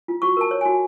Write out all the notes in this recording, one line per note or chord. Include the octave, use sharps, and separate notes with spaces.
F4
F#4 C#6
A#4 A5
C#5
F#4 G#5